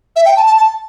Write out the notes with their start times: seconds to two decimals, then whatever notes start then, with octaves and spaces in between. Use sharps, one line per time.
0.16 E5
0.25 G5
0.37 A5
0.47 A5
0.57 A5